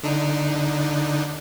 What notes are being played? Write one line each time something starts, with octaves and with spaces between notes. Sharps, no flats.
D3 D4 D#4